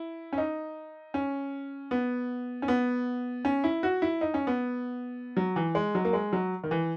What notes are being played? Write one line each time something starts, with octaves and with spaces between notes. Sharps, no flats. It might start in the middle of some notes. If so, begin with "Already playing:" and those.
Already playing: E4
C#4
D#4
C#4
B3
C#4
B3
C#4
E4
F#4
E4
D#4
C#4
B3
F#3
E3
G#3
F#3
A#3
G#3
F#3
D#3
E3